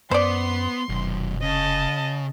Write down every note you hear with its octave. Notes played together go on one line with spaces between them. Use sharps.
F#2 B3 C5 D5 C6
F1 B1 F#2
C#3 D#5 A5